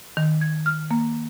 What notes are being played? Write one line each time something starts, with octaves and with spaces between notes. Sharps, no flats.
D#3
G#6
F6
A#3